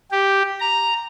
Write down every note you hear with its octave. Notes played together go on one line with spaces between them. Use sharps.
G4
A#5